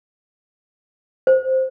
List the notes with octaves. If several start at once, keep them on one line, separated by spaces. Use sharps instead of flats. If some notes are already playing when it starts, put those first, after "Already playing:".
C5